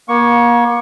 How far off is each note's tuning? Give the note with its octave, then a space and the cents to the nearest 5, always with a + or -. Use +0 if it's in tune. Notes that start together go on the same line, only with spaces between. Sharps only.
A#3 +35 C#6 +0